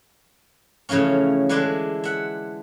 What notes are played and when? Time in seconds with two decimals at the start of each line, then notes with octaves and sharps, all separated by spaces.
0.89 A2 C#3 E3 F3 C#4
1.49 D3 E3 G#3 D4 E4
2.04 E5 F#5